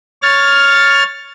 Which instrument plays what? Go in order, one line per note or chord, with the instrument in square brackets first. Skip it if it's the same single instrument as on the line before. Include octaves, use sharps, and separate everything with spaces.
[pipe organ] C#5 F6 A6